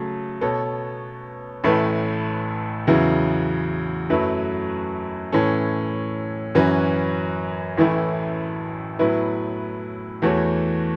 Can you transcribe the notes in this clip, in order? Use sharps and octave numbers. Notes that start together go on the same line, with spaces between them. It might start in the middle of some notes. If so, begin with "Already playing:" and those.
Already playing: C#3 F#3 A3
B2 B3 A4 C#5
A1 A2 A3 E4 B4
E2 C#3 F#3 B3 E4
F#2 F#3 A3 E4 B4
A2 E3 C#4 A4 C#5
F#2 E3 C#4 F#4 B4
A1 A2 E3 A3 E4
A2 F#3 B3 E4 B4
E2 E3 A3 F#4 C#5